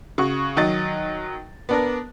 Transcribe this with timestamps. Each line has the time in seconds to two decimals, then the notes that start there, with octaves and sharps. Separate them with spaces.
0.18 C#3 F#4 C#6
0.56 D#3 F#3 D#5 A6
1.69 B3 D4 A#4